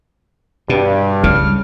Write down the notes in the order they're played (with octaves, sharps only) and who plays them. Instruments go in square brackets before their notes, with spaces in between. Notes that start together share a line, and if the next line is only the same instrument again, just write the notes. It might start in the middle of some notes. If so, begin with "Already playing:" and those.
[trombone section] G2 [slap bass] B2
[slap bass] C#3 [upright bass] G3 [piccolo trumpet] F6